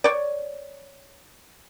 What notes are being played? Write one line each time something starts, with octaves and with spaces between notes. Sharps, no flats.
C#5 D5